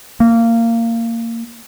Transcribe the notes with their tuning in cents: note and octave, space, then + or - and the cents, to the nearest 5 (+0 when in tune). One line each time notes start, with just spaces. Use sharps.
A#3 -20